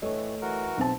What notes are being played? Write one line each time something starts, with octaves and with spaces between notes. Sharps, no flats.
A2 E3 A3 C#5 D#5
E3 F#4 A#4
B1 C4 A5